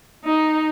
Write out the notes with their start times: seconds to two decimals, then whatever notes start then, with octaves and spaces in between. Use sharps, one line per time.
0.24 D#4